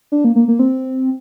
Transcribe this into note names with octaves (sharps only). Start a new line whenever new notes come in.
D4
A#3
A#3
A#3
C4